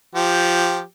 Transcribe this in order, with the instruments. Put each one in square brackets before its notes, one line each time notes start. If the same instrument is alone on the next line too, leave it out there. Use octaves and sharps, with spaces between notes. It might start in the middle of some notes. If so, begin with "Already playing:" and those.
[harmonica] F3 G4